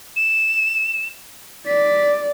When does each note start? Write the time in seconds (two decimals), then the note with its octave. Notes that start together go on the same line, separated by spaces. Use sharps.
0.16 E7
1.66 D5 B6